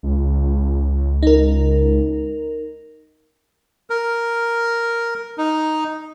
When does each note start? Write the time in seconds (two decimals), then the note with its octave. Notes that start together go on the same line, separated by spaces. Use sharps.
0.03 C#2
1.23 D#4 A#4
3.90 A#4
5.38 D#4